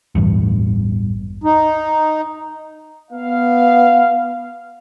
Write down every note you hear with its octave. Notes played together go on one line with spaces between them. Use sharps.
A1 E2 G2
D#4
B3 F5